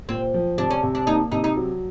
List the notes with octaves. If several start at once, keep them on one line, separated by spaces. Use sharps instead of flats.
A#2 C4
F3
C3 D4
C#4
C3
D4
A#3 D#4
C3 D#4
D#4
F#3